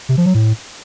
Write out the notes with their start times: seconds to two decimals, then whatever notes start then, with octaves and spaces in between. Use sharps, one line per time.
0.09 C3
0.17 F3
0.26 F#3
0.34 A2